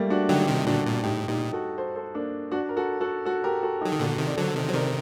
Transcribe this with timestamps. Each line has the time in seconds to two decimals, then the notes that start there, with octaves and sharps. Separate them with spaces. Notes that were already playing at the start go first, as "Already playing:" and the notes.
Already playing: G3 A3 A#3
0.10 D4 F#4
0.29 D3 F#3 D#4 G4
0.47 C3 D#3
0.67 A#2 D3 D4 F#4
0.85 A#2
1.04 A2 D#4 G4
1.28 A#2 D#4 G4
1.53 F#4 A4
1.78 A4 C5
1.96 A4 C5
2.15 A#3 D4
2.52 D4 F#4
2.69 A#4
2.77 F#4 A4
3.01 F#4 A4
3.25 F#4 A4
3.44 G4 A#4
3.63 F#4 A4
3.81 D#4 G4
3.85 F#3
3.92 D#3
4.00 A#2 D3 F#4 A4
4.18 C3 D#3
4.27 D5
4.37 D3 F#3 A4 C5
4.56 C3 D#3
4.67 F#3 C5
4.74 C3 D#3 A#4 D5